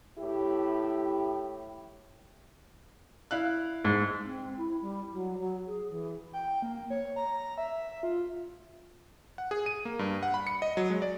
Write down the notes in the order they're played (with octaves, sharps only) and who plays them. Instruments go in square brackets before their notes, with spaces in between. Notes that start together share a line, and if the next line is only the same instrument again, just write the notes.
[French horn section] A2 E4 G4
[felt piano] E4 F5 F#6
[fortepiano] G#2
[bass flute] C4
E4
G3
F#3
F#3
G#4
E3
[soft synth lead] G5
A#3
C#5
A#5
E5
F4
[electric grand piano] F#5
G#4
D#7
A#3
G2
F#5
B5
C#7
D#5
F#3
G#3
D5